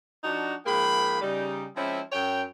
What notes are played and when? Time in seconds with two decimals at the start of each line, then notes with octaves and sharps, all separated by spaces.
0.24 F3 D4 D#4 F#4
0.66 G#2 F3 A#3 G#4 G5 B5
1.21 C#3 G3 D#4
1.77 F3 G#3 C4 C#4 E4
2.12 F#2 F#3 C#5 G5